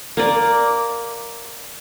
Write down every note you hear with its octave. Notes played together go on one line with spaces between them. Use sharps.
A#3 D5